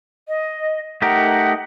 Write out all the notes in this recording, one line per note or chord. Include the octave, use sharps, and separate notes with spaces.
D#5
A3 D#4 G4 A#4 F#5